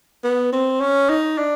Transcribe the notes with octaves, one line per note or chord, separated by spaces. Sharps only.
B3
C4
C#4
D#4
D4